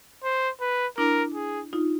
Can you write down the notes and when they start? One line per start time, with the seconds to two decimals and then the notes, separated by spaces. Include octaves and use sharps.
0.24 C5
0.61 B4
0.98 D4 E4 A#4
1.35 G#4
1.73 D#4 F4